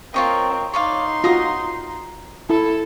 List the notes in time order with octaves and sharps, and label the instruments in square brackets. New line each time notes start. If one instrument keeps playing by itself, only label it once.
[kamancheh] C4 A#4 [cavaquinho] F4 C#5 D#5
[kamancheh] D#4 C6 [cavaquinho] C#5 D5 F5
[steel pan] F4 F#4 [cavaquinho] A#4 A#5 D#6
[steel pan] E4 [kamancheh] A4